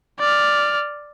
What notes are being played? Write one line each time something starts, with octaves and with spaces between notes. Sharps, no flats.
D5 F6